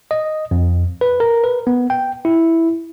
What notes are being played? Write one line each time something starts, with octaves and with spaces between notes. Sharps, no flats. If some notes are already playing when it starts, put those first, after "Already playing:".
D#5
F2
B4
A#4
B4
B3
G5
E4